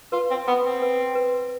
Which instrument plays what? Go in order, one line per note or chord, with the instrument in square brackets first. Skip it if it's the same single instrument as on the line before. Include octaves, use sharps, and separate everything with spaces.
[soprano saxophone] F4 [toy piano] B4
[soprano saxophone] C4
[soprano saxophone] B3 [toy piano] B4
[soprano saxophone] C4
[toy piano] B4
B4